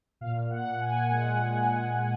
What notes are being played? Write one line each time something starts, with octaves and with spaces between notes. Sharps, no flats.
A#2 F5
A#2 F#5
A#2 G#5
G#3 F#5
G#3
G#3